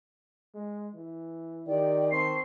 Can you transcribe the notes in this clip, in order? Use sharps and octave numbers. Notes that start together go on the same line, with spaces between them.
G#3
E3
D#3 G4 D5 G5
C4 A5 C6 C#6 C7